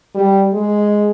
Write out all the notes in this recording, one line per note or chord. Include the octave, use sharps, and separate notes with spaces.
G3
G#3